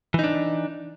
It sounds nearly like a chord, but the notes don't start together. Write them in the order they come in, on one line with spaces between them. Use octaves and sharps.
E3 D#4 D4